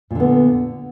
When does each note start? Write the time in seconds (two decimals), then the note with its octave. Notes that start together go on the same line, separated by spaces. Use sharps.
0.11 A#2
0.15 D3
0.20 B3